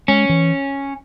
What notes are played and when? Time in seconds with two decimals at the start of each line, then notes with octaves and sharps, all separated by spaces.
0.08 G#3 C#4
0.29 E3